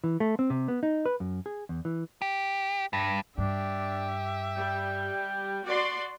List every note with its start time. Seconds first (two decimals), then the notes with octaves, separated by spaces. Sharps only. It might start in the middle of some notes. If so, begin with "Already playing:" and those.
0.04 E3
0.20 A3
0.39 C4
0.50 C3
0.68 B3
0.83 D#4
1.06 B4
1.20 F#2
1.46 G#4
1.69 E2
1.85 E3
2.22 G4
2.93 G2
3.38 G2 D4 G4 E5
4.56 G3 G5
5.65 F#4 D5 C6